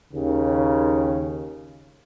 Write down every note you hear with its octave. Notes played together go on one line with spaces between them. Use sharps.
D#2 C#3